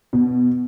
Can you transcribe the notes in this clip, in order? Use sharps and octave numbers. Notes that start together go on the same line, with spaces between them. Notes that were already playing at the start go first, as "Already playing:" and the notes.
B2